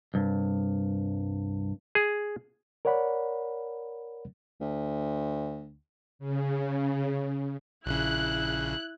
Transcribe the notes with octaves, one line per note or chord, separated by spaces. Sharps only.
C2 G2
G#4
A#4 C#5 D5 F#5 B5
D2
C#3
A#1 C#3 E4 F#6